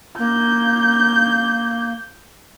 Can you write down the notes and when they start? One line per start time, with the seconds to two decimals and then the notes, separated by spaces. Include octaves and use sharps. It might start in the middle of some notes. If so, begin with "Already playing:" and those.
0.19 A#3 G6